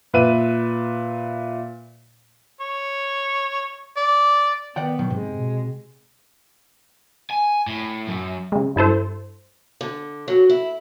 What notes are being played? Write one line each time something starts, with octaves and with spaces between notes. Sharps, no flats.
A#2 B4 E5 D#7
C#5
D5
D#3 B3 D5 F#5 G5
B2 D#3 F#3
G#2 C3 G#3
B2
G#5
A2
F#2
C#3 G#3
G2 E4 A4 C5
D3
F#3
E4